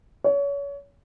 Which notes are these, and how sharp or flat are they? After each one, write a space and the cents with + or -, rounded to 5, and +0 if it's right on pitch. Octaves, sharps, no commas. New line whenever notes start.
C#5 +30